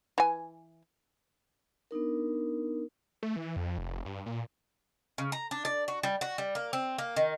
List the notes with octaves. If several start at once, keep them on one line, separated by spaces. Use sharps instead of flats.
E3 G#5
B3 D4 D#4 A#4
A3
E3
F2
F1
G2
A#2
C#3
A#5
D4
D5
F#4
G3
F#4
G3
A#3
C4
A#3
D#3